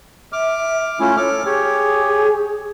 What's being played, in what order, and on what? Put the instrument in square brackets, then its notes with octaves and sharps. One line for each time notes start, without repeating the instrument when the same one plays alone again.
[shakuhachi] E5 [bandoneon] D6 F6
[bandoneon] A3 C#4 E4 [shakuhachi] F4
[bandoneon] A4 D6 F6 [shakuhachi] C#5
[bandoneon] G4 C#5 [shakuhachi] G#4